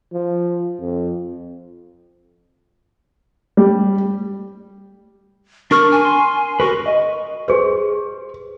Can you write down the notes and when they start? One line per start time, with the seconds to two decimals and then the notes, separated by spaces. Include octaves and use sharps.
0.13 F3
0.80 F2
3.57 G3
5.71 D4 A#4 C#6 F6
5.92 G#5
6.05 C6
6.60 F#4 A#4 B4 C#6
6.86 D#5
7.48 G4 G#4 B4 C5